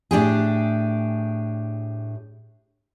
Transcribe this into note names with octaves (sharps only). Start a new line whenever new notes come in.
A2 D4 G4 G#4